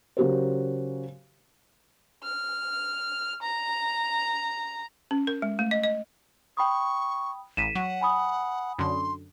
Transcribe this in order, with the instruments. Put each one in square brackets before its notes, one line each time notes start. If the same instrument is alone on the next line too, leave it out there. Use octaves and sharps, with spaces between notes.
[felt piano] C#3 F#3 F#4 G4 A#4 C5
[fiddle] F6
A#5
[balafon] C#4
A#4
G#3
A3
D#5
D#5
[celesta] G5 B5 D#6 [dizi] C#6
[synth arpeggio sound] A1 [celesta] B6 D#7 E7
[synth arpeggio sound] F#3 [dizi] F#5
[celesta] G#5 B5 D#6
[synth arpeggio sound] F#2 D3 [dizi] C6